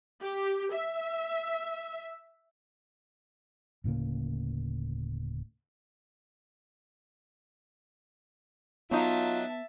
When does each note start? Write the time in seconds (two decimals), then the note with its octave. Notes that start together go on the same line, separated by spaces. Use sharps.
0.21 G4
0.72 E5
3.84 D1 A2 C#3 A#3
8.91 F#3 B3 D#4 F4 E5 A5